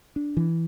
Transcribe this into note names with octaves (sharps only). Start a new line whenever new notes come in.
D4
E3